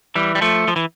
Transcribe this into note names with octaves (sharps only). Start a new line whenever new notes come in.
E3 G3
G3
F3 A3
F3
E3